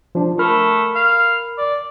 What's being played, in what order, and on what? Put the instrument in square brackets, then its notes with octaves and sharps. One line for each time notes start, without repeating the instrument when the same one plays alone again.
[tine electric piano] F3 D4
[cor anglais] A3 [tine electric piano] A#4 B5 F6
[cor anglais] F5
D5